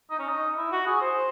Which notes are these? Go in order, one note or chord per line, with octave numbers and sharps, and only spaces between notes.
D#4
C#4
D#4
E4
F#4
G#4
C5